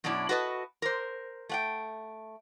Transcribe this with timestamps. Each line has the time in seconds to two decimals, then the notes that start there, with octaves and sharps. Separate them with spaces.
0.04 F#2 B2 C#4 D4 E4
0.29 F#4 A4 B4 D#5
0.82 A#4 C5
1.49 A3 F#5 G5